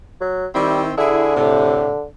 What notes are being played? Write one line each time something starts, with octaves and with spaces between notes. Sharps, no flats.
F#3
D#3 G3 C4 E4
D3 E4 G#4
A2 C3